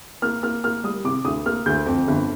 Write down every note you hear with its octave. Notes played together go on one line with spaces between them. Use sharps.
A#3 F6
A#3 F6
A#3 F6
G3 D#6
C3 D6
D2 D#6
A#3 F6
D2 G6
F2
G1